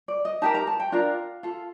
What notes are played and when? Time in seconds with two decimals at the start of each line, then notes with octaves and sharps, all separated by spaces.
0.08 D5
0.25 D#5
0.42 D#4 G4 A#4 A5
0.54 A#5
0.67 A5
0.80 G5
0.92 D4 F4 A#4 F5
1.43 F4 A4